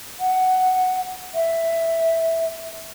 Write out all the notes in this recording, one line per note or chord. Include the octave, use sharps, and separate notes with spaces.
F#5
E5